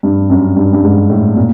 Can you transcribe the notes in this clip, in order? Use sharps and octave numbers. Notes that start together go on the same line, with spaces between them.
G2
F#2
G2
G2
G#2
A2
A#2